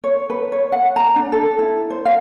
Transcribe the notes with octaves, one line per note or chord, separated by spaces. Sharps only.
C#5
B4
C#5
F#5
A#5
D4
A4
E4
C5
F5